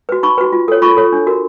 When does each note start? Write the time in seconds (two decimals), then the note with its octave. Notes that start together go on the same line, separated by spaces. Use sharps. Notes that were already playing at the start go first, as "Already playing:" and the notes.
0.09 F#4 B4
0.23 D#4 B5 C#6
0.38 F#4 B4
0.52 F4
0.68 A4 C#5
0.82 F4 B5 C#6
0.97 A4 C#5
1.13 D4
1.27 F#4 A#4